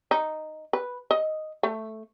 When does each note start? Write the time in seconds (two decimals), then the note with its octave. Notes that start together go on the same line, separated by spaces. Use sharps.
0.11 D#4
0.73 B4
1.11 D#5
1.63 A3